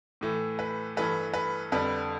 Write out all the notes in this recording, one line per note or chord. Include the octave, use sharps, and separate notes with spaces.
A2 E3 A3
B4
G2 E3 A3 B4
B4
F2 D3 G3 B4